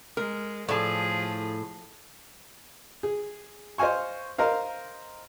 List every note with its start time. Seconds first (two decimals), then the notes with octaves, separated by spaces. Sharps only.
0.17 G#3 A#4
0.69 A2 F3 G#4 D5 A5
3.03 G#4
3.78 C5 D#5 F5 G#5 C#6
4.38 A#4 C5 D#5 F5